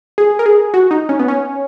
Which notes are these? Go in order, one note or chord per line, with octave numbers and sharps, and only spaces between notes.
G#4
A#4
G#4
F#4
D#4
C#4
B3
C#4